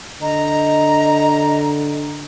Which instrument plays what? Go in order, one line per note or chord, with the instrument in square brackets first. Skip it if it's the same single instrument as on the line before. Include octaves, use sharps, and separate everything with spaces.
[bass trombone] D3 [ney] D#5 [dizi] A#5